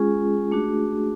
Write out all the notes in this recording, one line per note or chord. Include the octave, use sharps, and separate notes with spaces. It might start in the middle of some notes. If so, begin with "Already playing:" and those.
Already playing: G#3 C#4 F4 G#4
A3 D4 F#4